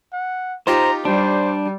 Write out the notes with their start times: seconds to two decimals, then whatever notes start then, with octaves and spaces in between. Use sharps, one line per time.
0.13 F#5
0.67 D#4 F4 G4 C5 A#5
1.05 G3 D4 C5